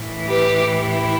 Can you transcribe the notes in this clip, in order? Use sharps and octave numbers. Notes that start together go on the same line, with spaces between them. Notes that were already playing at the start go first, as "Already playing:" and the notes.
Already playing: A2 E3
G4 B4
E4 G4